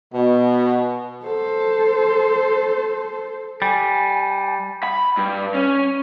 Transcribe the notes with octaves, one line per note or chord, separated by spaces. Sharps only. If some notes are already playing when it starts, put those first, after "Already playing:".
B2
A4 C5
G3 G#5
B5
G2
C#4